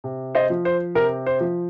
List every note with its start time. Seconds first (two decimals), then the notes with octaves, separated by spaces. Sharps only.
0.04 C3
0.35 C5 D#5
0.50 F3
0.65 C5
0.95 C3 A#4
1.27 C5
1.41 F3